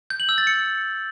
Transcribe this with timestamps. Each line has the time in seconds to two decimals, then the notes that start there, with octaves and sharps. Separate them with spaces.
0.10 G6
0.20 F#7
0.29 E6
0.38 A6
0.47 C#7